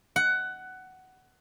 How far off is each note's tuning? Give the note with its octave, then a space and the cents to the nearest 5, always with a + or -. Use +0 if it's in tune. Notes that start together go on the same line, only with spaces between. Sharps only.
F#5 +15